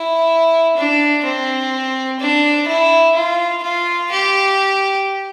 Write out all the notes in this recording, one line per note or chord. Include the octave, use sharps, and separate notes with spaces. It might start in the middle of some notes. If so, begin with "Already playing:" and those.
Already playing: E4
D4
C4
D4
E4
F4
F4
G4